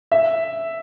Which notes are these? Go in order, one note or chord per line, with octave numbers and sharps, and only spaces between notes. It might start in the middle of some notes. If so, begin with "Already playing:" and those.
E5